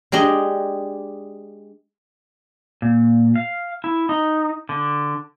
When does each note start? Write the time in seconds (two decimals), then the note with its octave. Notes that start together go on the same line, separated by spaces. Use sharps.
0.12 G#3 D4 G4 D#5
2.82 A#2
3.36 F5
3.84 E4
4.09 D#4
4.69 D3